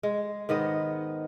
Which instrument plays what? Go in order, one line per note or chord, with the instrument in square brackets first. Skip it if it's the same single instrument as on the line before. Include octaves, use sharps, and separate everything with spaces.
[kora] G#3
G#2 D#3 B3 D#5